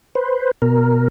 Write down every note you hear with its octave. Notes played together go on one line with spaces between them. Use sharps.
B4 C5
B2 A#4